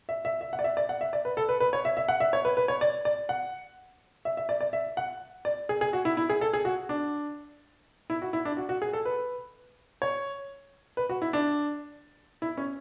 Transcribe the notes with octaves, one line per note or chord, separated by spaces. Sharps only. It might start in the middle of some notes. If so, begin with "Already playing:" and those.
E5
E5
E5
F#5
D5
E5
D5
F#5
E5
D5
B4
A4
B4
B4
C#5
E5
E5
F#5
E5
C#5
B4
B4
C#5
D5
D5
F#5
E5
E5
D5
D5
E5
F#5
D5
G#4
G#4
F#4
E4
E4
G#4
A4
G#4
F#4
D4
E4
F#4
E4
D4
F#4
F#4
G#4
A4
B4
C#5
B4
F#4
E4
D4
E4
C#4